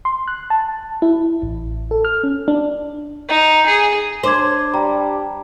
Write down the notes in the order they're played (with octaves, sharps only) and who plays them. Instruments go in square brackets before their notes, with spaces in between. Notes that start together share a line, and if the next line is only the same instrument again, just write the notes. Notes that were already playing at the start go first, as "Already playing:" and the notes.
[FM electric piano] C6
F#6
A5
E4
A1
A4
F6
C#4
D4
[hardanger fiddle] D#4
G#4
[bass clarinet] D4 [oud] C5 [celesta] C6 D6 G#6
[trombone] G3 [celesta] A#5